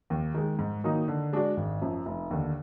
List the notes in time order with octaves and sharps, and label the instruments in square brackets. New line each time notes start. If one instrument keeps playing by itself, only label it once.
[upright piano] D#2
D#3 G#3
G#2
D#3 F#3 A#3 D#4
D3
G#3 D4 F#4 D5
G#1
F#2 F3
F1
D#2 D3